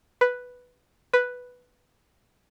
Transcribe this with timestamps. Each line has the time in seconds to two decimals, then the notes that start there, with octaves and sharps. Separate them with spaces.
0.21 B4
1.13 B4